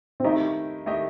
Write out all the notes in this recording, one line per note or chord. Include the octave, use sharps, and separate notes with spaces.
C4
D#3 A3 D#4 E4 G4 D#5
D#3 A3 E4 G4 D#5